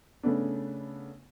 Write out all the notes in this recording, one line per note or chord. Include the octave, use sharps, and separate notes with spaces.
C#3 A3 B3 D4